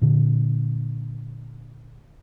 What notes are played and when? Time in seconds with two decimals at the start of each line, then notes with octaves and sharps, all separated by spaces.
0.01 A#2 D3